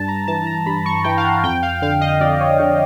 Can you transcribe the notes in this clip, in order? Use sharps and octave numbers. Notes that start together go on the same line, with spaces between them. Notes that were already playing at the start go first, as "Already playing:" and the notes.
Already playing: G2 A5
A#5
E3 A5
A#5
G2 B5
C#6
E3 G5
F5
F#5
F2 G5
F5
D3 F5
D#5
F2 D5
C#5
D3 C#5